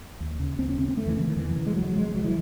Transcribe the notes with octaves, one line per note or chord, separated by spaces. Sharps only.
D#2
C#3
D#2 C4
C#4
C#3 C4
C4
E2 A3
E3
C#3
D#3
E2 E3
C#3
G#3
C2 F#3
C3 G#3
C2 F#3
E3